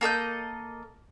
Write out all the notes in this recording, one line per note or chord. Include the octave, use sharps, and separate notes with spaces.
A#3 A4 D#5 G6